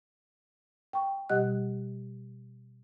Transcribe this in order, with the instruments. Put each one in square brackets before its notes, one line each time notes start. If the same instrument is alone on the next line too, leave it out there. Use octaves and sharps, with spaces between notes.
[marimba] G5 C#6
B2 G3 G4 D#5 F#5 F#6